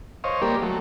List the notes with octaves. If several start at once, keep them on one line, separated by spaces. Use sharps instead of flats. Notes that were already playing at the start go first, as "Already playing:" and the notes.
C5 C#5 D#5 F5
G3 A#3 G4 A#4 C5 D5
F#3 A3